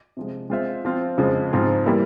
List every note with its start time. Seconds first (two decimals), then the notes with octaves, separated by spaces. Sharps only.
0.17 C3 F3 G#3
0.50 G#3 C4 F4 C5 E5
0.85 F3 C4 F4
1.18 F2 C#3 F3 G#3
1.51 G#2 F3 C4 F4 G#4
1.86 E3 G3 A#3 E4